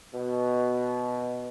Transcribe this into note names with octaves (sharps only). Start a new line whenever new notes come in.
B2